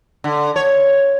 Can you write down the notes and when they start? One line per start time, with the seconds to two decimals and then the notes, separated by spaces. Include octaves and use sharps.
0.24 D3
0.56 C#5